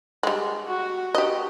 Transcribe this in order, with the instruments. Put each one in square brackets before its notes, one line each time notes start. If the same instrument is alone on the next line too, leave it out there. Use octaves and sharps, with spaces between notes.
[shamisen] G3 G#3
[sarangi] F#4
[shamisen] G4 D#5